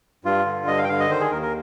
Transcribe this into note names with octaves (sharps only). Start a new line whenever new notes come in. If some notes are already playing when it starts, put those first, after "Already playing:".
G2 F4
D3
G2 D#5
F5
G5
D3 F5
D#5
D#3 C5
G#4
D#2 A#4
A#4